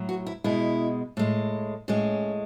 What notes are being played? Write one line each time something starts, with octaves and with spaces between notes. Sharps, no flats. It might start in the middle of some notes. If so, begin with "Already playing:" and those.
Already playing: A2 F#3
F#4
E4
B2 G#3 E4
A2 G#3
A2 G#3 C#4